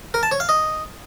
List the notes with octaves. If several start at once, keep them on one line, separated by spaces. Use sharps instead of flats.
A#4
A5
C#5
F5
D#5